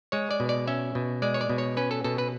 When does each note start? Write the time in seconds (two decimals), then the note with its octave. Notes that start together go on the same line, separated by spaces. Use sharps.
0.12 G#3 C#5
0.31 D5
0.40 B2
0.49 D5
0.68 C#4 E5
0.95 B2
1.22 G#3 D5
1.34 C#5
1.41 D5
1.50 B2
1.58 C#5
1.77 C#4 B4
1.91 A4
2.04 B2 A4
2.18 B4